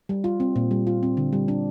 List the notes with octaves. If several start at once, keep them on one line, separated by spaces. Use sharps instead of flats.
G3
F4
C4
A#2
G3
F4
C4
D3
G3
D4